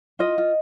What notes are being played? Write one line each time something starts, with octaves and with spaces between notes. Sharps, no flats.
F4 D#5
F4